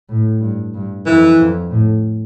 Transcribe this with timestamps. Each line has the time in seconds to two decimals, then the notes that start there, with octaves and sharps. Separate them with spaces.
0.09 A2
0.41 G2
0.74 G2
1.05 F2 E3
1.39 F2
1.71 A2